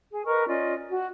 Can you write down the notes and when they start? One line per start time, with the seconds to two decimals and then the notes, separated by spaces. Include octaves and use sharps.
0.11 G#4
0.26 A#4 B4 D#5 C#6
0.48 C#4 F4 D5 D#5
0.89 F#4